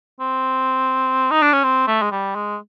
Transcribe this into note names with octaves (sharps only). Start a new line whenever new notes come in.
C4
D#4
D4
C#4
C4
A3
G#3
G3
G#3